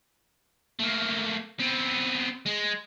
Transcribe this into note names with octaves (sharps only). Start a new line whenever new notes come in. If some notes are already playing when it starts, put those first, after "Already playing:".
A3 A#3
B3 C4
G#3